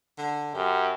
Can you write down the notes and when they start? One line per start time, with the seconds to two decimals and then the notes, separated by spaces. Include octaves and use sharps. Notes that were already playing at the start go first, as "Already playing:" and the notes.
0.18 D3
0.54 F#2 G4